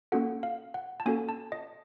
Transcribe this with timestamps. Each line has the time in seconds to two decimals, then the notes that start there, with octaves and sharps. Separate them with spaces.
0.12 A#3 C#4 F#4 A4 F#5
0.43 F5
0.74 F#5
1.00 A5
1.06 A#3 C#4 F#4 A4 G#5
1.29 A5
1.52 D#5